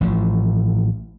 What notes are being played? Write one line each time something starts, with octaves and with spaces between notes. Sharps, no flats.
A1 A2 F3